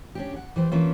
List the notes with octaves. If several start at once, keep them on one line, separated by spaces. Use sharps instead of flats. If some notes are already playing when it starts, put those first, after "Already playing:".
C#4 D4 G4
F#5
E3 G3 C5
E3 A#3 C#4 D4 E4 F4